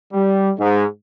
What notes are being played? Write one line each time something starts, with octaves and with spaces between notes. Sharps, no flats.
G3
G#2